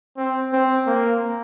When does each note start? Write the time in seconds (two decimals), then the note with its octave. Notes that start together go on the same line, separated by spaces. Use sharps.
0.17 C4
0.53 C4
0.87 A#3